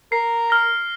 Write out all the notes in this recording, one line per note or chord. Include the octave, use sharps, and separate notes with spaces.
A#4 C7
F6 A#6